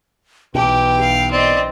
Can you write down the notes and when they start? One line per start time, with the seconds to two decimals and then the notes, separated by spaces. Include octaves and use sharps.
0.55 B1 B2 E3 G4 G5
1.00 F5
1.31 C4 D5 D#5